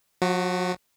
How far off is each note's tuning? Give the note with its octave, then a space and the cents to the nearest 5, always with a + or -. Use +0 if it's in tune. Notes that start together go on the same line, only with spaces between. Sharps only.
F#3 -45 F#4 +15